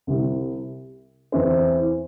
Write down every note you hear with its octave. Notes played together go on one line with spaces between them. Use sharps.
C2 C3 G3 C4
E2 E3 C4 E4 C5